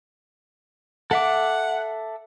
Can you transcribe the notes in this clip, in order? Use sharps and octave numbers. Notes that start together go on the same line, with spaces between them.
A4 E5 F#5 D6